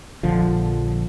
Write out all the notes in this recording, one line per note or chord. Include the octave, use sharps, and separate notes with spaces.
A#1 D3 F3